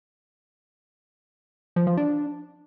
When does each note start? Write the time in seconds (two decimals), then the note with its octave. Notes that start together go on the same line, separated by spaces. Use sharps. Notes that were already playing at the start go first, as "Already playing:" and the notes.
1.76 F3
1.87 F3
1.97 D4